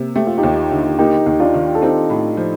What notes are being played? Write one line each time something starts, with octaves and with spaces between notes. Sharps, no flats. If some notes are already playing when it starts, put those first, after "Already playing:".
Already playing: C3 A#3
A3 G4
F4
D#4 G4
D#2
D3
A#3 D#4 G4
D#2
D4 F4
D#3
A4
C4 D#4 G4
A2
F3